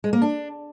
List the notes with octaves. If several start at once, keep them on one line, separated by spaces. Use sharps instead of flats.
G#3
A#3
D4